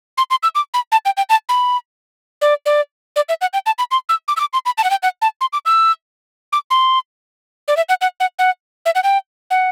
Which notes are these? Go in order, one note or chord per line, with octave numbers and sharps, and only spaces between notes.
C6
C6
E6
D6
B5
A5
G5
G5
A5
B5
D5
D5
D5
E5
F#5
G5
A5
B5
C6
E6
D6
E6
D6
C6
B5
A5
F#5
G5
F#5
A5
C6
D6
E6
D6
C6
D5
E5
F#5
F#5
F#5
F#5
E5
F#5
G5
F#5